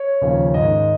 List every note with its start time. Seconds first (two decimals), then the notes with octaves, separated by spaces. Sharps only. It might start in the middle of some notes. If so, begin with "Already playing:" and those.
Already playing: C#5
0.22 D#2 C#3 F3
0.54 G#2 D#3 D#5